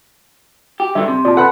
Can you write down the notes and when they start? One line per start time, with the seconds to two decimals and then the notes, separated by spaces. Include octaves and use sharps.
0.80 G4
0.95 G2 D3 E5
1.08 C3
1.25 A#2 D5 A5
1.37 A4 B4 F#5 A5 B5 F#6